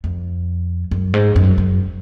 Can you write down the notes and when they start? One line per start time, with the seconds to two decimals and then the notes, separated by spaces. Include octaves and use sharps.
0.04 F2
0.91 F#2
1.14 G#2
1.36 F#2
1.58 F#2